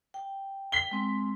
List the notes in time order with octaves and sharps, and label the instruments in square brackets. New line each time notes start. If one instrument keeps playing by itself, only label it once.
[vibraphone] G5
[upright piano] B6 G7
[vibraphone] G#3 C4